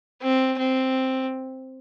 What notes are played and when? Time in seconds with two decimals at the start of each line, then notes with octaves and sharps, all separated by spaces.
0.23 C4
0.59 C4